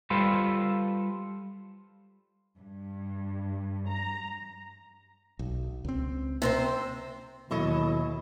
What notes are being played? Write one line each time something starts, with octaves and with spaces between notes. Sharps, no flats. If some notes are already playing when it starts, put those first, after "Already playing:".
G3 F4 A4 B4 C5
G2
A#5
B1
C#2 C4
C3 C4 C5
D#2 B2 F#3 E4 A4 D#5 E5